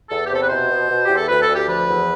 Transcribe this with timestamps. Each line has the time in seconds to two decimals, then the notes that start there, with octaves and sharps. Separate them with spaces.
0.10 E2 A4
0.27 G4
0.30 C3 A4
0.41 B4
0.49 B2 C5
0.69 B2
0.89 B2
1.05 E2 G4
1.17 A4
1.28 D2 B4
1.42 A4
1.48 D2
1.55 G4
1.69 F3 B4
1.87 E2